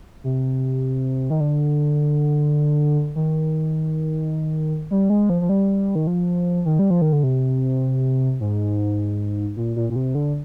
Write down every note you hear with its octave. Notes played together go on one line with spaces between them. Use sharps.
C3
D#3
D3
D#3
G3
G#3
F3
F3
G3
D#3
F3
D#3
G3
F3
D#3
D3
C3
G#2
A#2
A#2
A#2
C3
D3